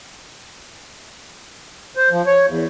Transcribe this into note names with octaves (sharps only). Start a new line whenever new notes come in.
C5
F3
C#5
E2